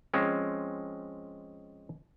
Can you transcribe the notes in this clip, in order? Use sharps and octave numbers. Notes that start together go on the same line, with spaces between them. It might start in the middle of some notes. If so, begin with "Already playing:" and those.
F3 G#3 C4 C#4